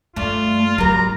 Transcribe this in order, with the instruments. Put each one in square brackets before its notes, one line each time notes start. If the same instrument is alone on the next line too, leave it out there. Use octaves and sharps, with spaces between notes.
[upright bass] G2 [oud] A3 D4 [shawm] F4
[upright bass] G#2 F#3 [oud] G3 A#4 [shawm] A#5